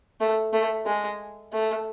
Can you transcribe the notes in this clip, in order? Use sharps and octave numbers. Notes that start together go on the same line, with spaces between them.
A3
A3
G#3
A3